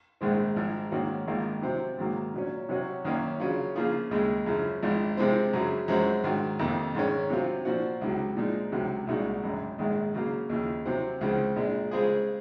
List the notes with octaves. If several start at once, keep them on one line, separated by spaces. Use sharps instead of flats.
A#1 G#2 D#3 G#3 C4
G#1 G#2 F3
G#2 D#3 A#3 C#4 F#4
G#1 G#2 D#3 A#3 F4
C3 F#3 C4
G#2 D#3 F#3 A#3
A#2 F#3 C#4
C3 F#3 C#4 F#4
F#2 D#3 A#3 C#4
C#3 F#3 C#4 F4
C#3 F3 A#3 F4 G#4
D#2 C#3 G#3
F#2 C#3 F3
G#1 G#2 F3
C3 F3 G#3 C4
F#2 C#3 F#3
F#2 F3 G#3 C4 F#4
G#2 D#3 F#3
F2 C3 D#3 A#3 D#4
G#2 D#3 G#3 C#4
C3 F#3 C4 F4
A#2 F3 C4 F#4
C#2 C3 F#3
A#2 F3 G#3 D#4
C#2 C3 F#3
C2 A#2 G#3 D#4 F#4
G#1 F#2 C#3
A#1 G#2 D#3 G#3
C#3 F#3 A#3
D#2 C#3 F3
C3 F#3 C4
C#2 C#3 F3 C4
A#1 A#2 G#3
C#3 G#3 C4 F4 G#4